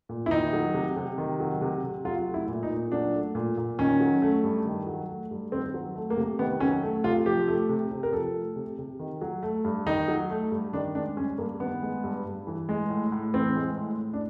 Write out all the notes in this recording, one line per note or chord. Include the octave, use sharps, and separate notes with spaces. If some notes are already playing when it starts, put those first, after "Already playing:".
A#2
E4
D#3 D#4
F#3
C3
C3
D#3
F#3
C3
C3
F#3 F4
A3
E4
A#2
D#4
A#2
F#3 D4
A3
A#2
A#2
D#3 C#4
F#3
A3
G2
D#3
F#3
A3
G2
D#3 C4
F#3
A3
A#3
C3
D#3 B3
F#3 C#4
A3
C3 F4
F3 G4
A3
C3
C3
A#4
F3 A4
A3
C3
C3
D#3
F#3
A3
G2
D#3 D#4
F#3
A3
G2
D#3 D4
G#3 D4
G2 C#4
G2 A#3
D#3 B3
G#3
G2
G2
E3
G#3
A2
A2
E3 C4
G#3
A2
A2
D4